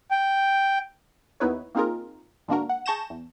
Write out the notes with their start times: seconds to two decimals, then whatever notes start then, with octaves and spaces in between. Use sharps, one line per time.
0.11 G5
1.40 D#2 B3 D#4 E4 B4 C#5
1.75 A#3 C4 D#4 F4 G#4 A#4
2.48 G#2 D3 A#3 D4 F#4 A#4
2.69 F#5
2.86 G#4 A5 C#6 G6 A#6 E7
3.10 E2